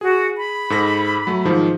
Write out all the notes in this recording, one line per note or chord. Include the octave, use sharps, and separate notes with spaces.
F#4 G#4
B5
G#2 A4 A#6
F#3 A3
G#2 D#3 F3